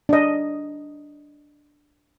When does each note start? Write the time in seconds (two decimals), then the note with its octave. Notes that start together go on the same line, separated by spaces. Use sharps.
0.09 D4 D#5